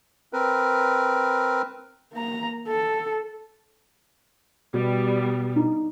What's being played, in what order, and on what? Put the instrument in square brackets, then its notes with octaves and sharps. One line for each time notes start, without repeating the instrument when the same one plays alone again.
[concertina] C4 A#4 B4
[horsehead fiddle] A#3 A#5
A4
[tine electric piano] B2 [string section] G3 B3
[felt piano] D#4